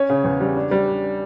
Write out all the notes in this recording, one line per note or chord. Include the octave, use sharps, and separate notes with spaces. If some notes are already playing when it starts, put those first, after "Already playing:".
Already playing: C#4 C#5
C#3
E2
G3
D4
G3